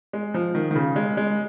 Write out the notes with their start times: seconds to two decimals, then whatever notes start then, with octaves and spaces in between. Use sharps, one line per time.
0.13 G#3
0.34 F3
0.55 D#3
0.71 D#3
0.75 C#3
0.96 G#3
1.17 G#3